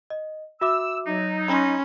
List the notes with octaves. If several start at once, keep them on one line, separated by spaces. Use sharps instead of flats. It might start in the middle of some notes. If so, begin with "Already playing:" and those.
D#5
F#4 E5 D6 E6
F#3 D#4
C#4 B5 C6